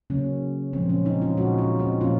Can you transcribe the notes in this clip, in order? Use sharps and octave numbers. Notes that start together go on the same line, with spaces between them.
C#3 F#3 A#3 C#4
A#2 F3 G#3 C4
C#4
C4 D#4
C#4 F4
A#2 G#3 D#4 F#4
C#4 F4
C4 D#4
A#2 F3 A#3 C#4 F4